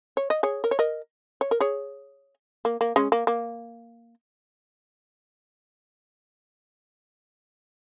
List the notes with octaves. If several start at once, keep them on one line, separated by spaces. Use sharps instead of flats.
C#5
D#5
G#4 C#5
A#4
C#5
A#4 D#5
C#5
A#4
G#4 C#5
A#3
A#3
G#3 C#4
A#3
A#3